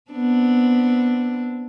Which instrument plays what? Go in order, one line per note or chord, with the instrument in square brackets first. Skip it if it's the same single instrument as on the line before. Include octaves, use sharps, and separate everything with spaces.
[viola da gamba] B3 C4 D4